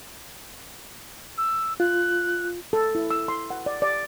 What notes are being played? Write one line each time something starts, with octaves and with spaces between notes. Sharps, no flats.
E6
F4 F#6
A4
E4
E6
C6
F#5
D5
D5